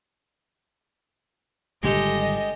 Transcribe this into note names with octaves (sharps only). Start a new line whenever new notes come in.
G#1 D3 G3 G#3 G4 A4 D#5